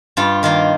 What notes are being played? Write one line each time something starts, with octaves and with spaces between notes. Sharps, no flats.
G2 F4
D#3 A#3 F4